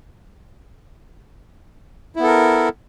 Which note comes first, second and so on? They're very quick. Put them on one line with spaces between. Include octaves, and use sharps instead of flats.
E4 B3 A4 A#4